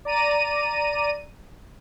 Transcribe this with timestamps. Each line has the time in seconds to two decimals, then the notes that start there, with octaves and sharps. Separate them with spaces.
0.05 D5 A#5 D#7